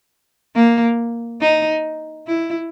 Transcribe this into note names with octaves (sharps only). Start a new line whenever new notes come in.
A#3
D#4
E4